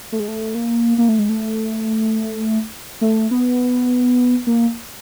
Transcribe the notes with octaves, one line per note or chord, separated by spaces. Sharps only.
A3
G#3
A3
A#3
A#3
A3
G#3
A3
A3
B3
A#3